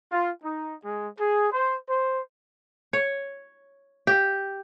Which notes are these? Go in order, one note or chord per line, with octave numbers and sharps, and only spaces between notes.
F4
D#4
G#3
G#4
C5
C5
C#5
G4